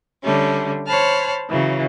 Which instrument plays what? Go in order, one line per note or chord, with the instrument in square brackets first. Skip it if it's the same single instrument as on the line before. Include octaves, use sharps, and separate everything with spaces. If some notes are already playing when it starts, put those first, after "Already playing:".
[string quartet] D3 G3 A3 C#4
C5 C#5 A5 B5 F6
C#3 E3 F#3